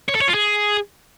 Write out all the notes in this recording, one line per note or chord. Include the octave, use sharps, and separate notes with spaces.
C#5
A4
C#5
F4
G#4